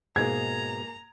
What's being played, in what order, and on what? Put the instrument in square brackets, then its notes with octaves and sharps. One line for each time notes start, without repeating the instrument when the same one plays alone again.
[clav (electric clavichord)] G#2 B2 D#4 [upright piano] A#3 G#4 [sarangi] A#5 [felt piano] G#6